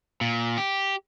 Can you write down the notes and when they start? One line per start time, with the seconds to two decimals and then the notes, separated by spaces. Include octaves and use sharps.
0.21 A#2
0.58 G4